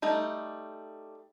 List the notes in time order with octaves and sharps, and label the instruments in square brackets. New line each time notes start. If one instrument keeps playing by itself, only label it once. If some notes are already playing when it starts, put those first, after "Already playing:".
[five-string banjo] G3 A3 D#4